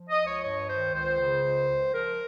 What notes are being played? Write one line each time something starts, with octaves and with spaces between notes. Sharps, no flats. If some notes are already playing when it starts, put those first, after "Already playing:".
Already playing: F3
D#5
C#2
C#5
G2 C#5
D#3 C5
C#2 C5
C#3
C#2
C#2
F3 A#4